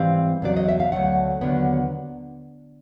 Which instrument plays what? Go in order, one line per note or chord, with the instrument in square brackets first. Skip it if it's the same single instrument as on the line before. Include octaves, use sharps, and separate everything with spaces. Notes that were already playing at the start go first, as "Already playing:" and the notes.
Already playing: [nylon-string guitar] G#2 E3 G3 C4 F5
E2 C#3 F#3 D5
D#5
E5
F5
D2 C#3 F#3 A3 F#5
D#2 D3 F#3 B3